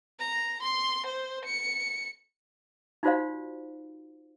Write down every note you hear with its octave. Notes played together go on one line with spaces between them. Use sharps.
A#5
C6
C5
C#7
D#4 F4 F#4 C5 D5 F5